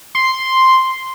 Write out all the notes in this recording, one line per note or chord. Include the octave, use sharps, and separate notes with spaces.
C6